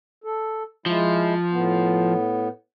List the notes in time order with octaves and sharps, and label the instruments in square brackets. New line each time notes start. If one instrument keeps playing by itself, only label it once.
[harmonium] A4
[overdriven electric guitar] F3 [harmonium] G#3 E4
[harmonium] A2 B3